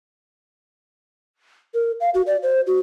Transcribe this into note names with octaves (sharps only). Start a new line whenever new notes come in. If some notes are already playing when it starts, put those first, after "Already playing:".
A#4
F5
F#4
D5
C5
F#4